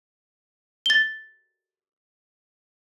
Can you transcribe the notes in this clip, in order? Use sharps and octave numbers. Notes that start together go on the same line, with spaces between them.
A6 G7